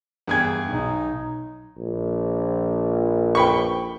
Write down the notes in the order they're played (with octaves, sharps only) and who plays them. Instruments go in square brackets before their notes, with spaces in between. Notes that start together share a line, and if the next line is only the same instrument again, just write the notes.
[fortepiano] E2 G#4 G5 [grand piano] G2 G#6
[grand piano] B1 [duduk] D#4
[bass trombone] A#1
[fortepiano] G5 B5 C#6